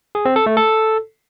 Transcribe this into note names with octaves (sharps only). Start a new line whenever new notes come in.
G#4
C4
A4
A3
A4